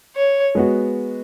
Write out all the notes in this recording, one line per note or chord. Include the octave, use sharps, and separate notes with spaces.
C#5
G#3 B3 F#4